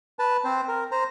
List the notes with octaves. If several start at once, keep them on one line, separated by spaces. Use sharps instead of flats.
B4 A5
C4 C5
A#4
C5 A#5